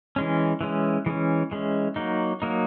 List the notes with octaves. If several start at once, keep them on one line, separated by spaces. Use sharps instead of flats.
E3 G#3 C#4
E3 G#3 C#4
E3 G#3 C#4
E3 G#3 C#4
F#3 A#3 D#4
F#3 A#3 D#4